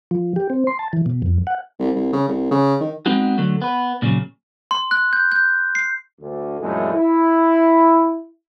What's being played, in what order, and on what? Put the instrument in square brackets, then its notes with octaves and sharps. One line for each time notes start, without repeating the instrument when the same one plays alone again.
[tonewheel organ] F3
G4
C4
C6
A5
E3
B2
F2
F#5
[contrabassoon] C2
C2
C#3
C2
C#3
D#3
[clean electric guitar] G#3 B3 C4 D#4 F#4
D3 F#3 A3
B3 B4
A#2 C#3 F3 F#3
[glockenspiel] C6
F#6
G6
G6
C7
[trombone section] D2 D3
A#1 F#2 A#2 E3 G#3 A3
E4